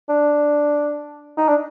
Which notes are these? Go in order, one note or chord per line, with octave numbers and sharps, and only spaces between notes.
D4
D#4
D4